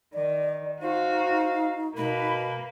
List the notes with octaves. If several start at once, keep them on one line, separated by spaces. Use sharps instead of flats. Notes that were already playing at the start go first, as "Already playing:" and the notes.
D#3 D5
D#4 F#4 C5 F5
B2 A#3 B4 B5